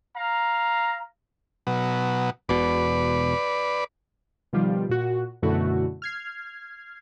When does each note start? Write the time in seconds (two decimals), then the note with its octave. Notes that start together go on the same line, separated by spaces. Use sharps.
0.15 F5 A#5
1.67 B2 F#3
2.49 E1 B2 B4 D5
4.53 B2 D#3 F3 G3 F4 G4
4.89 A#2 F#4
5.42 F#2 B2 D3 A3 E4 F#4
6.02 F6 G#6 C7